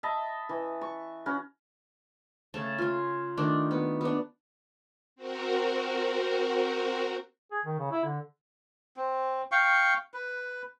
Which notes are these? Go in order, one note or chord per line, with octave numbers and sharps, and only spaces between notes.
D#5 E5 A5 B5
E3
C#6
C#4 F#4 B5
C#3 A3 A5
F4 G#5
D#3 A3 D4
B3
B3 D4
C4 F#4 A#4
G#4
D#3
C#3
E4
D3
C4
F5 G5 C#6
B4